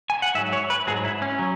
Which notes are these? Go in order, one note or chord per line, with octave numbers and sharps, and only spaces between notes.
G#5
F#5
G#2 F#3 E5
C#5
B4
G#2 F#3 G#4
E4
C#4
F#3